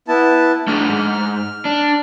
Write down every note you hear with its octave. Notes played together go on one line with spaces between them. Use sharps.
B3 E4 A5
A3 D4 G#4 F6
G#2
D4